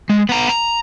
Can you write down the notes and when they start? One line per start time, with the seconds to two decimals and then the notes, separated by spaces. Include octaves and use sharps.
0.09 G#3
0.29 B3 A#5
0.49 A#5